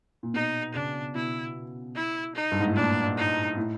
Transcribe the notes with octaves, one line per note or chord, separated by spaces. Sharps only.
A#2
B2 D#4
C#3 D4
B2 E4
E4
D#4
G2
G#2
A2
A#2 D4
D#4
A2